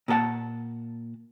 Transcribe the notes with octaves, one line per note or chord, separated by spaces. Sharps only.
A#2 G#4 A4 F#5 A5